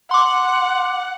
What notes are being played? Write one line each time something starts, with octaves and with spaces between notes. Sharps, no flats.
F#5 C6 D6